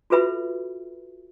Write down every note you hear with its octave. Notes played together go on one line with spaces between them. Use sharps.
F4 F#4 A4 B4 E5 B5